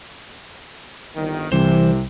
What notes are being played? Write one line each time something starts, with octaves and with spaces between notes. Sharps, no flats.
G1 D#3
C2 C3 E3 C5